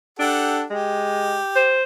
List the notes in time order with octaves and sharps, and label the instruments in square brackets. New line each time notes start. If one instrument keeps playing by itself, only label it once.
[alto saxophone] D4 [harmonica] G4 A4 F#5
[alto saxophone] G#3 [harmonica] G4
[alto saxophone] C5